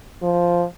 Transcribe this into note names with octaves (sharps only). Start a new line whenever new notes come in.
F3